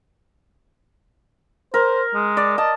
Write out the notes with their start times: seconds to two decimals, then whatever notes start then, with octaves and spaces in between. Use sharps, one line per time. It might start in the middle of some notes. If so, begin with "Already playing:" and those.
1.74 A#4 C5
2.14 G#3
2.37 D5
2.58 D#5 A5